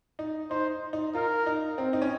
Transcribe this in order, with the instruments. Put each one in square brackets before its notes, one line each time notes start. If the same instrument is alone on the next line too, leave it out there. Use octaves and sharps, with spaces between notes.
[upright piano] D#4
[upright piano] D#4 [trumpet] C5
[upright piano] D#4
[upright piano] F4 [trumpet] A#4
[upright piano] D#4
C4
D#4
C#4